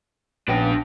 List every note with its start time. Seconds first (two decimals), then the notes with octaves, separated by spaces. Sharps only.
0.48 A#1 B3 C#4 D4 G5